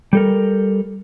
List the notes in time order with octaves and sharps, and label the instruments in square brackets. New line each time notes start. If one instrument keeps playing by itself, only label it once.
[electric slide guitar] G3 A4 A#4